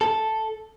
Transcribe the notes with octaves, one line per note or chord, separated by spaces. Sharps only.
A4